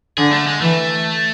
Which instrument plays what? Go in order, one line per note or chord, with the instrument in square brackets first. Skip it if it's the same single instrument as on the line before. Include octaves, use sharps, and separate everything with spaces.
[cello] D3 [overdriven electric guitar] G#4
[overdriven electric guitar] A3
G#3
[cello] E3 [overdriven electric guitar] A3